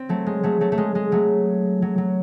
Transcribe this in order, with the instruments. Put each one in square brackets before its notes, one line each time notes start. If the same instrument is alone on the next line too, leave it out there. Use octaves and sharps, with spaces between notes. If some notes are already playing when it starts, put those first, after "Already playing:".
Already playing: [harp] C4
F#3 A3
G#3
F#3 A3
F#3 A3
A3
G#3
G#3
F#3 A3
F#3
F#3